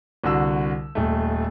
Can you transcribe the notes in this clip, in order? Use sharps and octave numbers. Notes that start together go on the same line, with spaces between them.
C2 D3 F#4 E6
D#1 A3